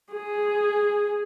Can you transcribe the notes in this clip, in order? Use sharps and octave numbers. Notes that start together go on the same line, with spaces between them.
G#4